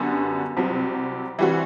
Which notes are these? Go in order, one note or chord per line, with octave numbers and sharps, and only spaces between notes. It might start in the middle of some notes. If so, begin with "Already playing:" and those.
Already playing: F#2 D3 G3 B3 F#4
C2 C3 F#3
E3 G3 C4 F#4